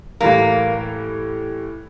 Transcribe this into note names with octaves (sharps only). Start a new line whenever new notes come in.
A2 E3 G3 A#3